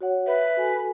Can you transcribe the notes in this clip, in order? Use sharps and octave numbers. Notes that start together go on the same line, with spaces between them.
F#4 C#5 F#5
B4 E5
F#4 A4 G#5